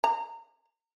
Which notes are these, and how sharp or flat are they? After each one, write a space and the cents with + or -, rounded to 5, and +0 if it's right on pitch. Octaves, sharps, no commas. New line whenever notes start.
A#5 -30